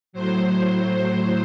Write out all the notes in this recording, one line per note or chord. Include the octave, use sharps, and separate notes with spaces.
A2 F#3 C5